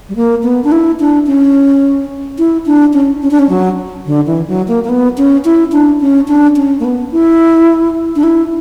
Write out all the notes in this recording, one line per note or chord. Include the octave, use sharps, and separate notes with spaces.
G3
A#3
B3
D4
E4
D4
C#4
E4
D4
C#4
C#4
D4
C#4
F#3
D3
E3
F#3
A#3
A#3
B3
C#4
E4
D4
C#4
D4
C#4
A#3
B3
E4
D4
E4